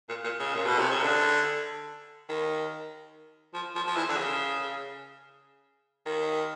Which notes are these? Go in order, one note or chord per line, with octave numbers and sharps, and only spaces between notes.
A#2
A#2
C#3
A#2
B2
C3
C#3
D3
D#3
F3
F3
F3
E3
D3
C#3
D#3